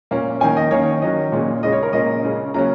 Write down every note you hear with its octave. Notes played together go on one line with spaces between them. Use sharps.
A#2 A#3 C#4
D#3 A#3 C#4 G#5
D#5
D#3 A#3 C#4 C#5
D#3 F#3 C#4 D#5
A#2 G#3 C#4
C#3 G#3 C#4 D#5
C#5
A#4
A#2 A#3 C#4 D#5
C#3 G#3 C#4
C#3 F#3 A#3 C#4 A#5